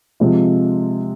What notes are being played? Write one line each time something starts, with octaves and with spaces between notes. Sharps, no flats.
C3 F3 G#3 C4 F4